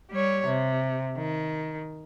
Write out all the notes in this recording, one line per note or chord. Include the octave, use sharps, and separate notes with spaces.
G3 C#5
C3
D#3